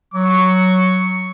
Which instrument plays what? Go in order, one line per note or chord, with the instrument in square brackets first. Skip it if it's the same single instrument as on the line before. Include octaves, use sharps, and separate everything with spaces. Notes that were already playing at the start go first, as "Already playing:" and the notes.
[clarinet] F#3 [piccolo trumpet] C#6